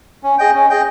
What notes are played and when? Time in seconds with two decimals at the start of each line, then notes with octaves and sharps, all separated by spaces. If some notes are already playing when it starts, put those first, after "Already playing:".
0.23 C#4
0.38 G#4 D#5 G5
0.54 C#4
0.70 G#4 D#5 G5